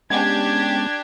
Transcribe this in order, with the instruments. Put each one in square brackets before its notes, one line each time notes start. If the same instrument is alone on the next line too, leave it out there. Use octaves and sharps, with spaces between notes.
[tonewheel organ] G#3 B3 C#4 [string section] D4 G4 [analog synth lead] G#6